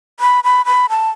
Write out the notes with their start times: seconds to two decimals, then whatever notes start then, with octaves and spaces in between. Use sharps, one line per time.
0.20 B5
0.44 B5
0.66 B5
0.90 A5